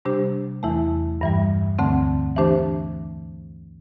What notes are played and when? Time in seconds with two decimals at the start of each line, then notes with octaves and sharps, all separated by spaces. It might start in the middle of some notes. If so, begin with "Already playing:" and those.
0.05 C3 G3 D4 G4 C5
0.63 E2 E3 A3 E4
1.21 G2 E3 G3
1.79 D2 D3 A3 C4
2.36 E3 A3 D4 G4 C5